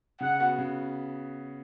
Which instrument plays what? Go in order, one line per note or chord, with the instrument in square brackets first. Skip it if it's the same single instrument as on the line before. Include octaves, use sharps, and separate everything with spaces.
[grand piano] C#3 [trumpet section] F#5
[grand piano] B3 F#4
C#3